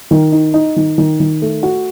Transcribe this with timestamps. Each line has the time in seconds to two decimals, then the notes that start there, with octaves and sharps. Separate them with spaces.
0.11 D#3
0.32 D#4
0.54 D#4
0.76 D#3
0.98 D#3
1.20 D#3
1.42 A3
1.63 F#4